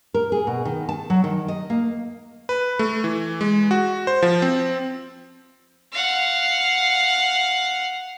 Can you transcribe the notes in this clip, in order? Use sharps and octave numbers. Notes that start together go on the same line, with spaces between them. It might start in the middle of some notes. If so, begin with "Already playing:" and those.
A#4
G#4
B2
D#3
A5
F#3
D#3
D#5
A#3
B4
A3
E3
G#3
F#4
C5
F3
C4
F5 F#5